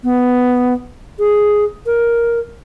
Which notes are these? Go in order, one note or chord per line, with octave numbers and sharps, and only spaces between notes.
B3
G#4
A#4